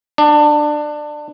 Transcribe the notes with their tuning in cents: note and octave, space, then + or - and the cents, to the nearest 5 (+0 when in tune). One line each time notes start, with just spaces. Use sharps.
D4 +20